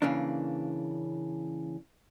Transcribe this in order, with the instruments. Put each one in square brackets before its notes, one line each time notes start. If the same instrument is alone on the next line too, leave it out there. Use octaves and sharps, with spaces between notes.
[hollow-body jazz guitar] C#3 E3 A#3 C#4 D4